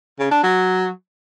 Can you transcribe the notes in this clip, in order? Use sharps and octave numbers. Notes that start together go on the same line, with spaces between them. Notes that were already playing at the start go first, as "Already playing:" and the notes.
C#3
D4
F#3